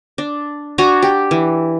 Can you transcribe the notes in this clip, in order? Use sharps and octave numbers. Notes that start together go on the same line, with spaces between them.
D4
D4 F#4 G#5 A#5
G4
E3